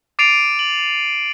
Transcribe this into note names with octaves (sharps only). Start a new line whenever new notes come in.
D6 A6 C7 D7 D#7 F7
F#7